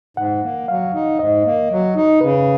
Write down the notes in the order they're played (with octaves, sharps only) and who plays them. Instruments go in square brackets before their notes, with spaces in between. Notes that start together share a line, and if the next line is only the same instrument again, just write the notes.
[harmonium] G#2 [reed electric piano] F#5
[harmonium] A#3
[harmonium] F#3 [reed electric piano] F5
[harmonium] D#4
[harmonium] G#2 [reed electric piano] D#5
[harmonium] A#3
F#3
D#4
[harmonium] C#3 [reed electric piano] B4